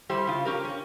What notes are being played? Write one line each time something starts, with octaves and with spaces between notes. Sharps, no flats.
G3 E4 G4 C5
C#3 F4
C#4 G4 A#4
C#4